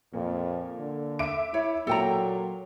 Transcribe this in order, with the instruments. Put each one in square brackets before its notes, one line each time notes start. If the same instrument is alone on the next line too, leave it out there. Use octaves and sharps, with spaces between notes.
[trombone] F2 [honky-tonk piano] A#2
[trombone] D3
[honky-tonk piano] E5 D6 D7
[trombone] E4 [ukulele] C#5
[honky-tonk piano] A#2 [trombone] F#3 [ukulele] A4 G5 A#5